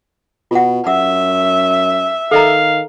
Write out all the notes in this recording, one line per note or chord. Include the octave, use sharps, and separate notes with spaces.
B2 F4 F#5
F#2 E5 F#5 E6
D#3 A4 D#5 F5 A#5